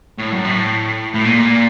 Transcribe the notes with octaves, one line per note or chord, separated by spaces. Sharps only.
A2
F#2
A2
A2
A#2